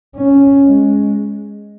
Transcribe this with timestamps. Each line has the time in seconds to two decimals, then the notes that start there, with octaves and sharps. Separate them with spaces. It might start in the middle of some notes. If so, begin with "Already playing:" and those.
0.16 C#4
0.65 G#3